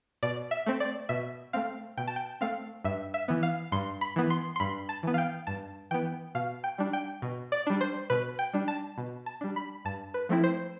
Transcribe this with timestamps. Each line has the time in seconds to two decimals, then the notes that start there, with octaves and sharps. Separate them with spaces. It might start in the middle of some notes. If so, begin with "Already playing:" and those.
0.23 B2 D5
0.51 E5
0.66 A3 C4
0.80 D5
1.09 B2 E5
1.53 A3 C4 F5
1.97 B2 G5
2.07 A5
2.16 G5
2.41 A3 C4 F5
2.84 G2 E5
3.14 E5
3.28 E3 B3
3.43 F5
3.72 G2 C6
4.01 B5
4.16 E3 B3
4.30 C6
4.56 C6
4.60 G2 B5
4.89 A5
5.03 E3 B3
5.14 F5
5.18 G5
5.47 G2 A5
5.91 E3 B3 G5
6.35 B2 F5
6.64 G5
6.78 G3 D4
6.93 G5
7.22 B2
7.52 D5
7.67 G3 D4
7.81 C5
8.10 B2 B4
8.39 G5
8.54 G3 D4
8.68 A5
8.98 B2
9.26 A5
9.41 G3 D4
9.56 B5
9.85 G2 A5
10.14 B4
10.29 F3 A3 C4 E4
10.44 C5